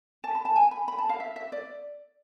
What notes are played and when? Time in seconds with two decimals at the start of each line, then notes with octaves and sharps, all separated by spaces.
0.24 A5
0.35 B5
0.45 A5
0.56 G#5
0.71 B5
0.88 B5
0.98 A5
1.09 F5
1.20 E5
1.36 E5
1.52 D5